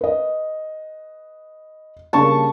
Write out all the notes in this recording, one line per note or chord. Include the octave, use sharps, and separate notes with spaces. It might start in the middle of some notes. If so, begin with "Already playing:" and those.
B4 D#5
G2 C#3 A#3 A5 C#6